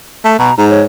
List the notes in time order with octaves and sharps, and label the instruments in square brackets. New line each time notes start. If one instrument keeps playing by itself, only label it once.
[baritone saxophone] A3 [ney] A5
[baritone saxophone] B2 [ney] A#5
[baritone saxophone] G#2 [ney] A#5
[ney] C#5